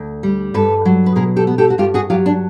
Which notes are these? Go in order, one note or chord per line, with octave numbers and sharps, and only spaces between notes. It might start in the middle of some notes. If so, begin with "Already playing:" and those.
Already playing: D2
G3
G2 A4 B4
F#3
B4
B2 G#4 A#4
G4 A4
B3
G4 A4
F#4
G2 F4 G4
F#4 G#4
F#3 F4 G4
D4